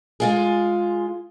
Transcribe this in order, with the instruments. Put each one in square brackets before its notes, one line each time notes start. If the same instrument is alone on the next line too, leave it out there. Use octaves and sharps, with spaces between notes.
[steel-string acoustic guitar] G#3 F4 G#4